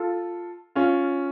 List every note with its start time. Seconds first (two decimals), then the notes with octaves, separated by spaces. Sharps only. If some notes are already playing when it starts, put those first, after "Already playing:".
Already playing: F4 A4
0.75 C#4 F4